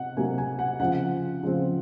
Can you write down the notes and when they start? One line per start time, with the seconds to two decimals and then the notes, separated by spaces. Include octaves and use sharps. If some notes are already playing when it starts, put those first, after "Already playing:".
Already playing: C3 F#5
0.17 C3 F#3 A#3 G#5
0.38 G#5
0.59 F#5
0.80 C#3 F3 C4 F#5
1.43 C#3 F3 C4